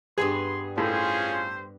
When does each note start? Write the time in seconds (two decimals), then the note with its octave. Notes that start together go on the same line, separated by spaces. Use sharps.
0.18 G2 G3 B3 G#4 C6
0.78 A2 C#4 F4 G#4 C5